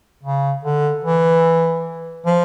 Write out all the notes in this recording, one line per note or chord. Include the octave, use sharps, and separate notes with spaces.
C#3
D3
E3
F3